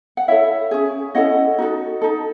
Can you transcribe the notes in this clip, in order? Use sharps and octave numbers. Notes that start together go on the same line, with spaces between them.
F#5
E4 A4 C#5 E5
C#4 G#4
C#4 E4 A4 D#5 F#5
D#4 F#4 A4
D#4 A4